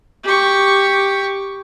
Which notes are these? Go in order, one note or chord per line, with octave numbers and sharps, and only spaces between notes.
G4 C#6